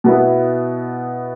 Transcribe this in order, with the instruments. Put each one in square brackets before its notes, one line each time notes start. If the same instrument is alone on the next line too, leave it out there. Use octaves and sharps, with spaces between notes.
[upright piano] B2 B3 E4